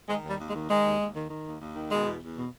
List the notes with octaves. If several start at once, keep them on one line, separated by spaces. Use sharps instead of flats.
D#3 G#3
D#2
G3
D#2
G#3
D#3
D#3 G#3
D#2
D#2
D#3
D#3
D#2
D#2
D#3
B2 G#3
E2
E2
B2